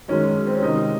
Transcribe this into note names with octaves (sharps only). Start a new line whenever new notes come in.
F#2 D#3 G#3 C#4
C4
C#4
C3 D#3 G#3 D#4